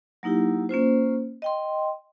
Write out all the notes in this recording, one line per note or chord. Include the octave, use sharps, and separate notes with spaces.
F#3 A#3 D#4 E4 G4
A#3 C#4 F4 C5
D#5 G5 C6